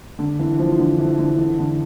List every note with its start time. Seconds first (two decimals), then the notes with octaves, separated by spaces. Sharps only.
0.19 D3
0.39 E3
0.59 F3
0.79 D3
0.98 E3
1.19 D3
1.38 E3
1.59 D3